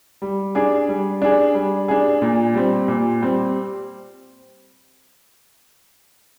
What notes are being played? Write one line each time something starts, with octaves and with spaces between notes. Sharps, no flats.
G3
D4 G#4
G3
D4 G#4
G3
D4 G#4
A#2
G3 C4
A#2
G3 C4